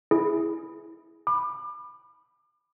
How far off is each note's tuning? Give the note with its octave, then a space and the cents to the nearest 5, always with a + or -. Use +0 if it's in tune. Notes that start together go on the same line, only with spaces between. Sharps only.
E4 +0 G#4 +5
B5 +0 D6 +35